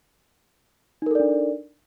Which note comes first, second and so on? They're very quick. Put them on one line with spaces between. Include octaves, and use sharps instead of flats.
D#4 A#4 A4 D5 D4